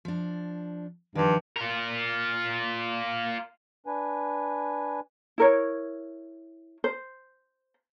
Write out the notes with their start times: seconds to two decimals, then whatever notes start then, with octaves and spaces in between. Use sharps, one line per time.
0.05 F3 D4
1.15 G2 D#3 F3
1.56 F4 A#4
3.87 D4 B4 G#5
5.38 E4 A#4 C#5
6.84 C5